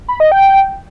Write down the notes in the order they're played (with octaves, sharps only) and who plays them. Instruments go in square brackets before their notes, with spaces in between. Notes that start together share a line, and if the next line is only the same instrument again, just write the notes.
[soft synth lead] B5
D#5
G5